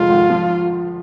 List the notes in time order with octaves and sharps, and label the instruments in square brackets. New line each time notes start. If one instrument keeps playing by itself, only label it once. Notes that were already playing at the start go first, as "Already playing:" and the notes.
Already playing: [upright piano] F1 F3 G#3 [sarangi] F4
[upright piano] G#1
F3